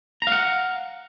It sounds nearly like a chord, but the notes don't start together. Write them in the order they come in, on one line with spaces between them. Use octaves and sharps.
A#5 F5 F#5